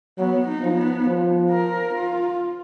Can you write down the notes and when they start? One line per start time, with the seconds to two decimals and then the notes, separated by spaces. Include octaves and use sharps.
0.18 F#3 B3
0.48 D#4
0.62 F3
0.77 B3
1.07 F3
1.50 A#4
1.95 F4